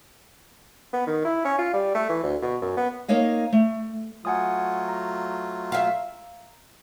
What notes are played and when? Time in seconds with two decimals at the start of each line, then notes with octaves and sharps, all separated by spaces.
0.93 B3
1.07 D#3
1.25 E4
1.45 C#4
1.58 F4
1.73 G3
1.94 A3
2.09 E3
2.23 D2
2.42 B2
2.61 F#2
2.77 B3
3.08 A#3 D#4 C#5 D#5 F5
3.53 A3
4.25 F#3 A3 F4 F#5 G#5 D#6
4.88 A#5
5.72 E5 F5